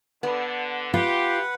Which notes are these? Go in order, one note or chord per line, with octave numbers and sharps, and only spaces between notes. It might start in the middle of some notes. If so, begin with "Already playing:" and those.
D3 B3
F4 G4 B4 F#5